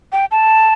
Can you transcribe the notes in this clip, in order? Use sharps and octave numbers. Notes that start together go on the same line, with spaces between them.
G5
A5